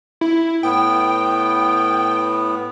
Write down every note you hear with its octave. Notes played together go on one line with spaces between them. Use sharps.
E4
A2 B3 G5